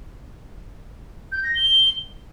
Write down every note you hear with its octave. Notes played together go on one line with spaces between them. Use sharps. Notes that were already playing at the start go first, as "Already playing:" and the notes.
G6
A#6
G7